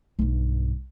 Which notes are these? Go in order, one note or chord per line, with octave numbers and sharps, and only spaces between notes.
B1 G2